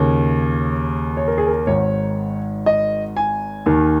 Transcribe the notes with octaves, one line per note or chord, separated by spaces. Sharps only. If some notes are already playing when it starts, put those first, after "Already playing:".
Already playing: D#2 C#3 C#5
C#5
A#4
G#4
A#4
G#1 G#2 D#3 C#5
D#5
G#5
D#2 D#3